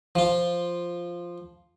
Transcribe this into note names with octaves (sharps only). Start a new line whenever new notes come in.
F3 F4